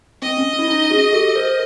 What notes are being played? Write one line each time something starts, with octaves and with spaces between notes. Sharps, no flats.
C4 D#5
C#4
E4
C#4 D#4
F#4 G#4
G4 A4
A#4 C5